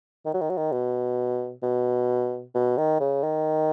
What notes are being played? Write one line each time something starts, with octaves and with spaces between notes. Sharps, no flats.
D#3
F#3
D#3
F#3
D#3
B2
B2
B2
D#3
C#3
D#3